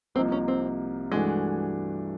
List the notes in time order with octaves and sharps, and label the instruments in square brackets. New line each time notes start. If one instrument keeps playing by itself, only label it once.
[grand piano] C2 C3 F3 A#3 D#4 [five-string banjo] C4
[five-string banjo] C#4
C4
[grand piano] G2 E3 A3 D4 F#4 [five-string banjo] G#3